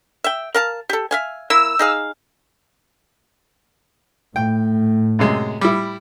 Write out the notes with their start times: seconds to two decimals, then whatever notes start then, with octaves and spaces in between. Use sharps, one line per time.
0.24 E5 G5
0.54 A#4 F5 A5
0.89 G4 A4
1.11 E5 F5 G#5
1.50 A#3 E4 E6
1.79 D#4 G#4 F5
4.36 A2 G5
5.19 F#2 C3 G#3
5.61 G3 E4